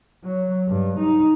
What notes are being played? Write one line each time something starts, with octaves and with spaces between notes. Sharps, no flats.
F#3
G2
D#4